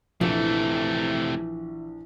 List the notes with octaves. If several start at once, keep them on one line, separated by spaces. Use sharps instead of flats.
A#1 C3 E3 F3 A3